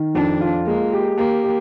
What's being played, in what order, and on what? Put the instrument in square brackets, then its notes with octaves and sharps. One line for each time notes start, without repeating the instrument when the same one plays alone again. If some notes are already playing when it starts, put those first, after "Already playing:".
Already playing: [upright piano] D#3
[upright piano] F2 [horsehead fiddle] D4
[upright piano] F4
[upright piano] G#3 [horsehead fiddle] A#3
[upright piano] G4
[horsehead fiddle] A#3 [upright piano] G4
[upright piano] G4